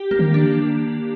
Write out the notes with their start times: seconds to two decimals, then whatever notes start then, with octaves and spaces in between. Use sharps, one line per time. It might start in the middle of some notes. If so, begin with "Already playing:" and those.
Already playing: G4
0.11 A#3
0.19 D#3
0.34 D4